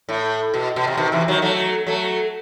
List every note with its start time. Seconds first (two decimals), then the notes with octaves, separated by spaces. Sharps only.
0.09 A2
0.54 B2
0.76 B2
0.87 C3
0.97 B2 D#3
1.12 C3 E3
1.28 D#3 F#3
1.42 F#3 A3
1.87 F#3 A3